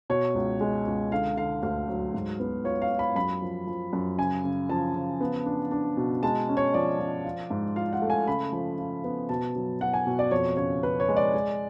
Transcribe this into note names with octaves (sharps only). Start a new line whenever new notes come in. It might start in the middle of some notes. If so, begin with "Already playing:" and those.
B2 C#5
C#2
G#3
C#2
D3 F5
D3 F5
D2 F5
F#3
G#2
B3
F4 C#5
F5
F4
B5
F#2 B5
F3
F3
F#2
C#3 G#5
C#3
F3 A5
C#3
B3
D4
D4
B2
G#3 A5
C#4
C#5
F3 D5
F3
F4
G#2
F4 F5
F#5
A3
G#5
C#3 B5
F3
F4
B3
B2 A5
F#3
F#3 F#5
G#5
B2
D5
F2 C#5
C#3 C#5
C#3 B4
C#5
G#3
D5
G#3